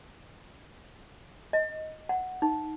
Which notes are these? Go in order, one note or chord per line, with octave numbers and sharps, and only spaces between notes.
D#5
F#5
D#4